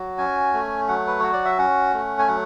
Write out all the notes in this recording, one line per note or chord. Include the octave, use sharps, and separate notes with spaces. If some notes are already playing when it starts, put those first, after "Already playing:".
Already playing: F#3 F#4
C#4 G#5
A3
F#3 F#5
B4
F#4 C#5
D5
E5
C#4 F#5
A3
G#5
F#3 F#5